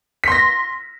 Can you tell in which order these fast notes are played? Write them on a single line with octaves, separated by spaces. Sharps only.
B6 C6 A#6